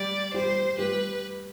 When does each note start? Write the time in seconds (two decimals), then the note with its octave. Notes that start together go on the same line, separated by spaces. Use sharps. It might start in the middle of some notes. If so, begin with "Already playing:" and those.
Already playing: G3 G4 D5
0.34 G3 G4 C5
0.78 G3 G4 B4